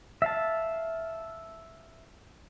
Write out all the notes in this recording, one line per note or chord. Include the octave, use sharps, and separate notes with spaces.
E5 F5 A5